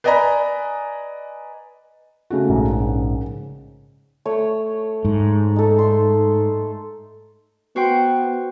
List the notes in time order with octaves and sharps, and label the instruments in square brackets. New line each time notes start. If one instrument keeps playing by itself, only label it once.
[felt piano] B4 D5 D#5 G#5 A#5 B5
C#3 A3 F#4
[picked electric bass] A#1 G#2
[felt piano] C#3
[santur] A3 C#5
[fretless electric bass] G#2
[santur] D#4 A4
C6
[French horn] B3 [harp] F#4 C5 G5